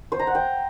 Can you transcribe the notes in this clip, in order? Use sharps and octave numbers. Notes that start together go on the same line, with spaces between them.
C5
A#5
F#5
G5